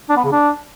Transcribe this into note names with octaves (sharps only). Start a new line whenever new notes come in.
D4
B3
C#3
D4